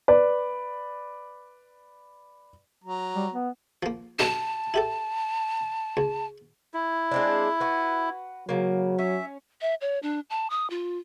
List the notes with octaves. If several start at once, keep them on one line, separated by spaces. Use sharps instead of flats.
B4 D5
F#3 A#5
G3
B3
F3 A#3
B1 G2 D#4 A5
E4 G4 A4
C#2
E4
G#3 C4 D4
F#4 B4
C#3 F#3 A#3
C#4 E5
E5
C#5
D4
A5
D#6
F4